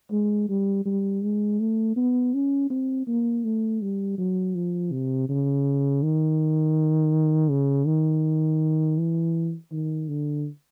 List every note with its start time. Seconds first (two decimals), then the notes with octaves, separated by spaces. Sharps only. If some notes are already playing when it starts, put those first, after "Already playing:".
0.12 G#3
0.49 G3
0.85 G3
1.22 G#3
1.60 A3
1.96 B3
2.34 C#4
2.70 C4
3.07 A#3
3.44 A3
3.81 G3
4.18 F#3
4.55 F3
4.92 C3
5.29 C#3
6.03 D#3
7.50 C#3
7.86 D#3
8.98 E3
9.72 D#3
10.08 D3